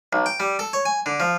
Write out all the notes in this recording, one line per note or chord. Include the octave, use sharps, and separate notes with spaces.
B1
G5
G3
A4
C#5
G#5
D3
F3